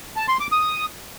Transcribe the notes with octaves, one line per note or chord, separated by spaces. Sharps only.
A5
C6
D6
D#6